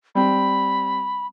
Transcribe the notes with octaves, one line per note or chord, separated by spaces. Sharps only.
G3 C4 B5